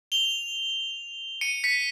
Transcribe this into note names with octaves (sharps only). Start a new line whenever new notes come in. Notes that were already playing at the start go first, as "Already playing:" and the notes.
F7 G7
C#7 D#7
B6 C#7